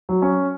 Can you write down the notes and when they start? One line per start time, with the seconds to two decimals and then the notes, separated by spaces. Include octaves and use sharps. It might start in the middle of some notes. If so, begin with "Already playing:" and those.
0.09 F#3
0.22 C#4